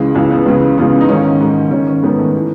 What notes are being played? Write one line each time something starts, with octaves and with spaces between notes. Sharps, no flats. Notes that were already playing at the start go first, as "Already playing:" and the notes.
Already playing: C#2 C#3 E3 G#3
C#2 C#3 E3 G#3
B3
C#2 C#3 E3
C#2 C#3 E3 B3
D#4
G#2 D#3 C#4
G#2 D#3
G#2 D#3 C#4
C#4
G#2 D#3 B3
A3
E3